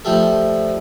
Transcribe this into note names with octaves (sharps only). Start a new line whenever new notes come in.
F3 G3 A3